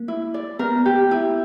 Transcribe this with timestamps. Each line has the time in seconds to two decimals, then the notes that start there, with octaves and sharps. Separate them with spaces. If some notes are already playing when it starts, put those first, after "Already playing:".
Already playing: A#3
0.08 E4
0.34 D5
0.59 B3 A#4
0.86 G4
1.11 E4